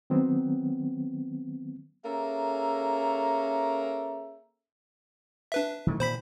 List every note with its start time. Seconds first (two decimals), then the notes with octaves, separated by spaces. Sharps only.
0.10 D#3 F#3 B3 C4
2.05 A#3 C#4 G#4 A4 E5 A#5
5.52 D4 B4 E5
5.87 D#3 E3 A3
6.00 A#2 D#3 C5 B5 B6